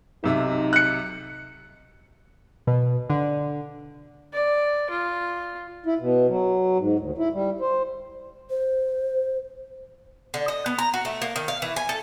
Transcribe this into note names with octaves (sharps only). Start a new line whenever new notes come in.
B1 C3 D#4 E5
F#6 C#7
B2
D3
D5
F4
E4
B2
F#3
G#2
D2
E4
G3
C5
C5
D3
D#5
B3
A#5
F#4
A3
A#3
D#3
F5
E3
G#5
A4